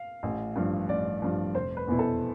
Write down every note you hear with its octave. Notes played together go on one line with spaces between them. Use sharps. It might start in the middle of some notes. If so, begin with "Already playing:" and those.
Already playing: F5
A1
G2 F3
A1 D5
G2 F3
F1 C5
B4
E2 B2 B3 E4
A4